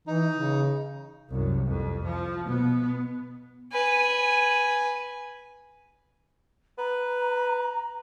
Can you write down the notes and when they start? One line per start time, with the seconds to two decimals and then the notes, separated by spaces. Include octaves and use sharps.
0.07 E3 D#4
0.35 C#3
1.29 C2 F#2
1.67 F2
2.05 F3
2.45 B2 B3
3.72 B4 G#5
6.78 B4 A#5